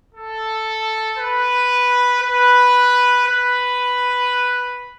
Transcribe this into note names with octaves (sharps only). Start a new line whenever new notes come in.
A4
B4
B4
B4